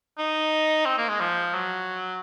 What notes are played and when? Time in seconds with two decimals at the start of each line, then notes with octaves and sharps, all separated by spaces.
0.18 D#4
0.85 C4
0.98 A#3
1.08 G#3
1.20 F3
1.54 F#3